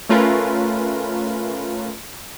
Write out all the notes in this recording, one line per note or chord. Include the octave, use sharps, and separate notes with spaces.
A3 C#4 F4 A#4 B4